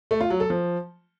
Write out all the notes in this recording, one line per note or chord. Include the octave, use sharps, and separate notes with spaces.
A3
F4
F#3
A4
F3